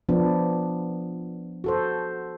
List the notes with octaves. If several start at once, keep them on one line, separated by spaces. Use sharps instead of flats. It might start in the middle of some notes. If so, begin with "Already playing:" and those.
F3 B3 D4
F#4 A4 C5